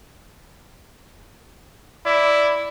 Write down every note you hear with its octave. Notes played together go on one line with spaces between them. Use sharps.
E4 D5